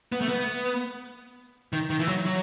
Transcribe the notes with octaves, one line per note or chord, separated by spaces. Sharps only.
B3
A3
B3
D#3
D#3
E3
F#3
F#3